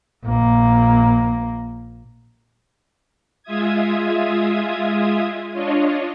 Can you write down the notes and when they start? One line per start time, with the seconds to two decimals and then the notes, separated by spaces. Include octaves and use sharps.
0.25 A#1 A#3
3.43 G#3 F4 E5 D#6 G#6
5.52 D4 F4 C#5 D#5